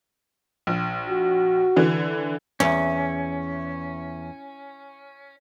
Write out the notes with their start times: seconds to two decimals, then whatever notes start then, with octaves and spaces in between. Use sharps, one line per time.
0.67 A#1
1.09 F#4
1.76 D3 E3
2.60 E2 C#4